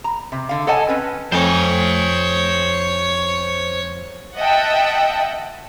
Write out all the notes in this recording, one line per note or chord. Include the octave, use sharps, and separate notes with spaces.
A#5
C3
D3 F5
A4 C#5 D#5 F#5 G#5 A5
C4 C#4 B4
F2 C5 C#5 G#5
D#5 E5 F#5 G5 A5